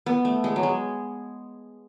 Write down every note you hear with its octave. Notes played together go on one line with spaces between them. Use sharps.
B3
A3
G#3
F#3
G#3